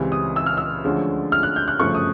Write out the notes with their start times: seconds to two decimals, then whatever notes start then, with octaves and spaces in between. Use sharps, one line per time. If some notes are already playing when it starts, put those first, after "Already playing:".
Already playing: C#2 C#3 E3 G3 C4
0.12 D#6
0.36 E6
0.46 F6
0.57 E6
0.84 D2 D3 F3 G#3 C#4
1.32 F6
1.43 F#6
1.56 G6
1.68 F#6
1.80 G1 F#2 C#3 F3 A3 C#6
1.95 D#6